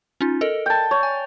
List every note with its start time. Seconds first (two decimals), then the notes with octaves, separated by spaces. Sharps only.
0.21 C#4 D#4 F4
0.41 A4 A#4 D#5
0.66 G5 A5
0.91 C#5
1.03 G#5